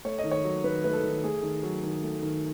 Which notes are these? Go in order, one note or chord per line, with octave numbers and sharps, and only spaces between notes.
A3 C#5
D#5
D#3
C#5
F#3
D#3 B4
A3 B4
A4
D#3
A3 G#4
D#3
F#3
D#3
A3
D#3